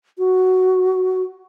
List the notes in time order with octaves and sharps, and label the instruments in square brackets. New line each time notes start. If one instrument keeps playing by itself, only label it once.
[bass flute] F#4